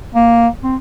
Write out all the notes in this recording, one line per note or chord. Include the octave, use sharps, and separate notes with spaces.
A#3
C4